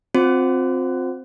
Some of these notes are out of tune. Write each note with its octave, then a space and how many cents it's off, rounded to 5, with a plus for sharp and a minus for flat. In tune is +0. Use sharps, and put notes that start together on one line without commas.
C4 +0 F4 +35 C5 +0